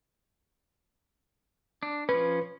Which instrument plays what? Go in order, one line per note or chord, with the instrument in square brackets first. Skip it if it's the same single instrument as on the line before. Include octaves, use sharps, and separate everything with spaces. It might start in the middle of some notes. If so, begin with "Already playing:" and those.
[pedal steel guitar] D4
[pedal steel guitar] F3 C#4 [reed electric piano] B4